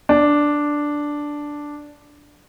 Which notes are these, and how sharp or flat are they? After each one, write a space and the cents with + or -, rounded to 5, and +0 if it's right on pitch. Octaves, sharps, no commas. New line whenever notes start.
D4 +0